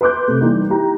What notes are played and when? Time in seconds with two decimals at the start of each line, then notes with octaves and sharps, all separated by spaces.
0.01 B4 C6 D6 F#6 G6
0.28 C3 A3
0.41 E3 G3 A#3 D#4
0.70 E4 G4 A#5